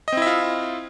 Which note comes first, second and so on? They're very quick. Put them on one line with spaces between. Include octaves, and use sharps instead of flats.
D#5 C4 E4 E5 F4